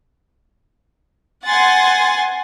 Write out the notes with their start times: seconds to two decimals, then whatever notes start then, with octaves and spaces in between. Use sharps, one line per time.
1.47 F#5 G#5 C6 A6